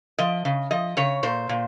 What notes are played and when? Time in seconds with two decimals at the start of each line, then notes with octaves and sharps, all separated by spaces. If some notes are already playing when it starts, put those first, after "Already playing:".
0.18 F3 D#5
0.45 C#3
0.71 F3 D#5
0.97 C#3 C#5
1.23 A#2 C5
1.49 A#2